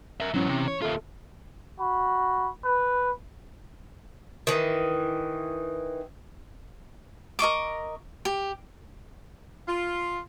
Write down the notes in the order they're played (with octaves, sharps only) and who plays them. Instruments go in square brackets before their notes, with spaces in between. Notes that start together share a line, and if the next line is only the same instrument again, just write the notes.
[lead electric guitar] A#4 E5
[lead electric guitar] G#2 F#3 [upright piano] E3 C#4
[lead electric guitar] C3
C#5
[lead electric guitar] D#2 F4 [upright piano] A4 E5
[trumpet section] F#4 B5
B4
[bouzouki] D#3 E3
[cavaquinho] A#4 D#5 C#6 D6
G4
[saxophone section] F4